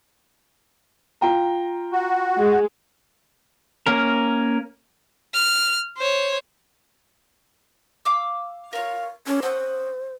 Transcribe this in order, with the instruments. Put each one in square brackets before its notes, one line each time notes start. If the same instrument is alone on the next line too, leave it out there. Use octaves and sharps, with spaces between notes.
[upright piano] F4 G5 A#5
[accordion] F#4
[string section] G#3
[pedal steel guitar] A#3 C#4 A#4
[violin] F6
C5 C#5
[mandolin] F5 D6 E6
[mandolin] A#4 C#5 [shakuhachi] F5
[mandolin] A#3 A4 [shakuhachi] C#4
[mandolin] C#4 F#5 D#6 [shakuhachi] C5